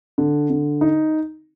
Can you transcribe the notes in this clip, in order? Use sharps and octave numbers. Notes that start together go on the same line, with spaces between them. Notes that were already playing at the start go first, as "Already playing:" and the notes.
D3
D3
D#4